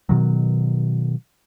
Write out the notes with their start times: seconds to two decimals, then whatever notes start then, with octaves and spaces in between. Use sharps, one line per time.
0.09 B2 D#3 F#3